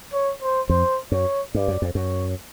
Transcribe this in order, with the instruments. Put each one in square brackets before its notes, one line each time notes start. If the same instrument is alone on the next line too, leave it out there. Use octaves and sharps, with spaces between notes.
[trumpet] C#5
C5
[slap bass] F2 [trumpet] C5
[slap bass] F#2 [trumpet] C#5
[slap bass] G2 [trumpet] D5
[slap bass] F#2
F2
[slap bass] F#2 [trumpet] C#5